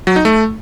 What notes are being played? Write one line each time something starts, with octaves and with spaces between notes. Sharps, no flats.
F#3
D#4
A3